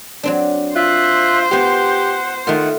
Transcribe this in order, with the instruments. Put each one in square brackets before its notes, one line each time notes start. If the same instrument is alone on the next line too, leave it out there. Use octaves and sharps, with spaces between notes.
[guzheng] F#3 C4 D4
[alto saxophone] F4 [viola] C5 [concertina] E5 F#6
[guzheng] B3 F4 [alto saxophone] G4 [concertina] F#5
[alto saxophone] D#3 [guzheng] A3 F4 [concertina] F#5